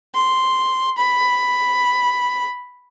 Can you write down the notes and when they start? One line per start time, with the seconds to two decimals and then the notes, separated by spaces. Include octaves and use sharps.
0.15 C6
0.98 B5